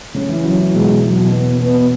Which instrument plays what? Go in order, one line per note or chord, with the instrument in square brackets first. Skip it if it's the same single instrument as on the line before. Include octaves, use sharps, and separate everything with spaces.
[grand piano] C#3 [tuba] C#4
[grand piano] E3
F#3
E3
[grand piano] B2 [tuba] G#3
[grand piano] B2 [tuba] F#3
[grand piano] B2
[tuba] B3
B3